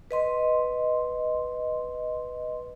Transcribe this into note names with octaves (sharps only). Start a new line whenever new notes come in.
B4 D#5 C6